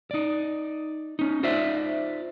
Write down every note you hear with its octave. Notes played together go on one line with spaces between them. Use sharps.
D#4 D5
C#4 D#4
D#4 F4 C5 D5 E5